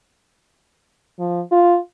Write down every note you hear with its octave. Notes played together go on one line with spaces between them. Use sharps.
F3
F4